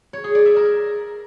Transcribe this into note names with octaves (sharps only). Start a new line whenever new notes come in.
C#5
G#4
D5
E5
A#4